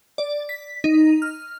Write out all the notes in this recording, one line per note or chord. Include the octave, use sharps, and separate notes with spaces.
D5
B6
D#4
F6